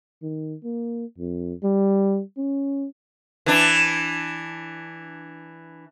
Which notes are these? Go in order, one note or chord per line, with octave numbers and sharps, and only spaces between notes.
D#3
A#3
F2
G3
C#4
E3 D4